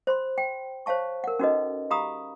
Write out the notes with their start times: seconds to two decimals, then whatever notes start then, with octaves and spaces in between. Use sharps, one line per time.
0.07 C5 B5 C6
0.38 G5
0.86 C5 C#5 F5 A5 C#6
1.24 A#4 F#5
1.39 C#4 D#4 F#4 A4 B4 D#5
1.91 G4 F5 A#5 B5 D#6